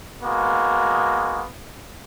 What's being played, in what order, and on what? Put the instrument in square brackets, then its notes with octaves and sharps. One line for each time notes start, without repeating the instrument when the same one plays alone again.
[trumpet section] G#3 A#3 B3 F#4